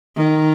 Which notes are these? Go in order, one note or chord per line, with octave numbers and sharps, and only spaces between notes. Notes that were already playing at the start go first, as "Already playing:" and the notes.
D#3